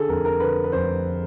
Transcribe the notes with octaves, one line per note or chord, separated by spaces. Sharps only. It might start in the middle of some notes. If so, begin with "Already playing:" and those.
Already playing: D3 G#4 A4
F1 A#4
A#4
D3 B4
B4
F1 C5